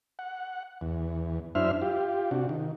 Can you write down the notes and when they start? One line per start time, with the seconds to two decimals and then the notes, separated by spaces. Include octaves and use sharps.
0.19 F#5
0.81 E2
1.55 F#2 D4 E4 C5 E5 F6
1.82 F4 G4
2.31 C3 D4 F#4
2.49 D#3